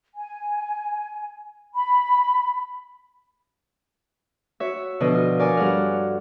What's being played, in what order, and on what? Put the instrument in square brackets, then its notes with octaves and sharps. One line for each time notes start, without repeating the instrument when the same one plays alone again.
[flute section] G#5
B5
[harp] F#4 C#5 E5
B2 D3 F3 D#5
F4
A#4 C#5 D5 G#5
G2 F#4 A4 F#5 F6